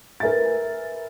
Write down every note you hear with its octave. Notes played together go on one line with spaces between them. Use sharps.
A#4 B4 E5 G#5 A6